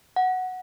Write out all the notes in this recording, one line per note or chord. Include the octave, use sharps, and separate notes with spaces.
F#5